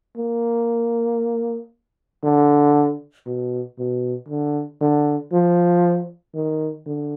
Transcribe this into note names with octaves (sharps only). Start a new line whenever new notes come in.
A#3
D3
B2
B2
D3
D3
F3
D#3
D3